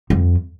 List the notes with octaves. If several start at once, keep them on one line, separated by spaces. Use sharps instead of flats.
F2